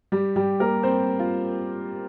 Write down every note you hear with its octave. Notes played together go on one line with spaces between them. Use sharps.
G3 G4
G3 G4
A#3 A#4
C4 C5
F4